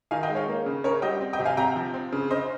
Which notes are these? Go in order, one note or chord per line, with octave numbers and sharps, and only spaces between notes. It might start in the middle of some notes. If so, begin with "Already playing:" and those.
D#3 F5 G#5
D#5 G5
G#3
C#5 F5
A#3
C#3
C#3 A#4 C#5
G3 D#5 G5
C4
D#5 G5
C3
F5 G#5
C3 G5 A#5
F3
C4
C#3
C#3 C5 D#5